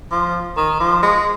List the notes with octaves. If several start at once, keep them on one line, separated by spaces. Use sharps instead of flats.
F3
D#3
F3
G#3